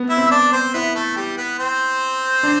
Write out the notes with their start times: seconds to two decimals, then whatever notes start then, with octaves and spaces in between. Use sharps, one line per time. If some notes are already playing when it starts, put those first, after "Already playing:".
Already playing: B3
0.10 E4 E5
0.17 C4
0.26 E5
0.31 D4 D5
0.52 C4 C5
0.74 B3 E4 B4
0.95 A3 A4
1.16 G3 G4
1.37 B3 B4
1.58 C4 C5
2.43 D4